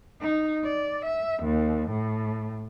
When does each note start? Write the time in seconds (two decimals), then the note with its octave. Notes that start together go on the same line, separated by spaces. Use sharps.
0.21 D#4
0.64 D5
1.05 E5
1.43 D#2
1.90 A2